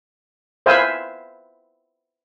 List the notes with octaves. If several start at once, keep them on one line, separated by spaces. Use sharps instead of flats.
B4 C5 E5 F5 G#5